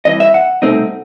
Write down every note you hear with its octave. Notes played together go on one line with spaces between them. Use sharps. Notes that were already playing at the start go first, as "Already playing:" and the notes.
C2 C3 E3 D#5
E5
F#5
C2 B2 A3 C4 D#4